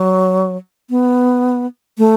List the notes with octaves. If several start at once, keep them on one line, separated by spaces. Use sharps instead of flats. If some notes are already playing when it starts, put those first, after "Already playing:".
Already playing: F#3
B3
A3